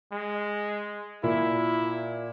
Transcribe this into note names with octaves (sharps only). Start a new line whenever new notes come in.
G#3
A#2 E4